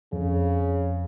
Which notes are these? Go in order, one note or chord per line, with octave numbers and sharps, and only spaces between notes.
F2 C#3